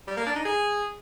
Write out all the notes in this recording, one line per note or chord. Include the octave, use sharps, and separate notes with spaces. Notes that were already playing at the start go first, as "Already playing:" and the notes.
G3
A#3
D4
D#4
G#4